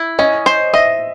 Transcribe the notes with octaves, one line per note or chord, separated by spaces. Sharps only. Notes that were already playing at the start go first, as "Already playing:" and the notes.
Already playing: E4
C#4 D#5
C5
D#5 E5